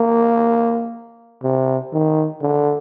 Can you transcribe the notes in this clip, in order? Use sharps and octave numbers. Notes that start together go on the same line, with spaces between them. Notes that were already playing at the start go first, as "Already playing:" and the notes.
Already playing: A#3
C3
D#3
D3